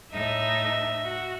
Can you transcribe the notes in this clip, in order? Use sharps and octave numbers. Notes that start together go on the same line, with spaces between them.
A2 D#4 E5
F#4